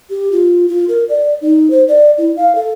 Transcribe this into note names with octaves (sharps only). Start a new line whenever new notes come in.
G4
F4
F4
A#4
D5
D#4
C5
D5
E4
F5
A4